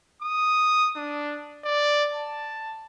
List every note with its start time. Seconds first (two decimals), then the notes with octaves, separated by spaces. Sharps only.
0.22 D#6
0.96 D4
1.64 D5
2.14 A5